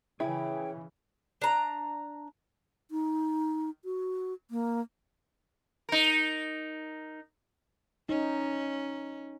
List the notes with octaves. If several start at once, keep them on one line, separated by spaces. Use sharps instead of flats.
C#3 E3 E4 G#4 C#5 G5 G#5
D4 A#5
D#4
F#4
A#3
D#4 A#4
C#4 D#4